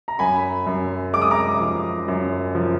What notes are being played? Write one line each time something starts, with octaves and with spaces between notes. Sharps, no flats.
A#5
F#2 G#5 B5
F#2
G#3 D6
D#6
A#5 D6
F3
F#2
F3